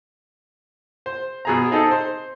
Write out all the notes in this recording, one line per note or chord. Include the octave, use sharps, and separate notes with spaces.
C5
B2 G#4 A#5
C4 D#4 G#4 A4
C5